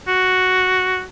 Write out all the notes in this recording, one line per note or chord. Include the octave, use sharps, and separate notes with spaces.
F#4